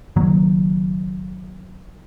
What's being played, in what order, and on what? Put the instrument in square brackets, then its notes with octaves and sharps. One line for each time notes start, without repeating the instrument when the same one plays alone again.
[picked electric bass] F#1 D#3 F#3 A#3